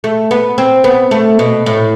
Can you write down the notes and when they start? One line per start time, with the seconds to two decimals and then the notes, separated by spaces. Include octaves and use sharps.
0.04 A3
0.31 B3
0.58 C4
0.84 B3
1.11 A3
1.39 B2
1.66 A2